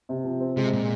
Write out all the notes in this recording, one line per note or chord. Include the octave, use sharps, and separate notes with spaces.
C3
F3
C4
C3 G#3
A#2